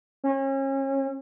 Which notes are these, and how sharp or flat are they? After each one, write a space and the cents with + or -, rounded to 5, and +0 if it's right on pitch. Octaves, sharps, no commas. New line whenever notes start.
C#4 -35